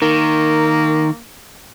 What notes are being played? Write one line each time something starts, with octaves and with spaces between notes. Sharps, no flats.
D#3 A#3